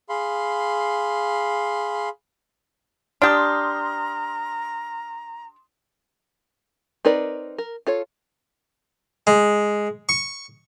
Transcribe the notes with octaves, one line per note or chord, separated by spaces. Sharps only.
G#4 F5 B5 C6
D4 G4 A#5 C6 D#6 F6
C4 D#4 A#4 B4 D5
A#4
F4 A4 C#5
G#3
C#6